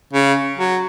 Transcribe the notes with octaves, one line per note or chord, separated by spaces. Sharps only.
C#3
F#3